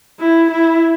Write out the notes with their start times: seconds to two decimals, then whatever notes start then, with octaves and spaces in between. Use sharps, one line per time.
0.19 E4
0.50 E4